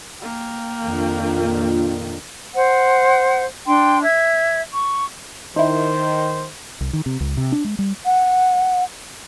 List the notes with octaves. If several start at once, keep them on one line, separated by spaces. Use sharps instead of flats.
A#3 G5
F2 D#3 D4 F4
A#2
C5 F#5
D4 G5 C6
E5 G#6
C#6
D#3 D#4 E4 C5
C2
D#3
C3
C#2
C3
D4
G#3
G3
F#5